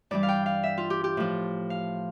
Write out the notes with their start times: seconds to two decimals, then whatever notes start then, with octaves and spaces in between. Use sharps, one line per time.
0.11 G2 E3 G3 D5
0.23 F5
0.28 G5
0.46 F5
0.63 E5
0.78 F4
0.90 G4
1.04 G4
1.17 A2 F3
1.70 F5